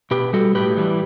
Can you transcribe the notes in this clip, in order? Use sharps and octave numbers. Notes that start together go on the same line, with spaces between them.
B2 G4 B4
G3 F#4 A4
A2 G4 B4
E3 G3